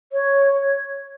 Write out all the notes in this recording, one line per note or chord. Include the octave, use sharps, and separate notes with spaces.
C#5